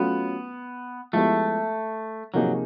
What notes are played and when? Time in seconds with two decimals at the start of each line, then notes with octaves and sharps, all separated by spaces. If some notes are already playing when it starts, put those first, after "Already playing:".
Already playing: F#3 A3 B3 C#4 F4
1.13 F3 G#3 A3 B3 E4 G4
2.34 C3 F3 F#3 A#3 D#4 G#4